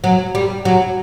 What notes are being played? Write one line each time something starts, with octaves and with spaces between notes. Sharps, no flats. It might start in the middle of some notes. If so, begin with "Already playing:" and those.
F#3
G3
F#3